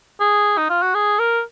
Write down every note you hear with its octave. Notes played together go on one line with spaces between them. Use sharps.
G#4
D#4
F4
F#4
G#4
A#4